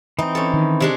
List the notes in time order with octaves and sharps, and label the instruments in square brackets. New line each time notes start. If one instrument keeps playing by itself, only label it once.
[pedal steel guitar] E3 C4 [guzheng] D#4
[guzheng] C#4 A4
[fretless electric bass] D#3
[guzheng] C3 G#3 D4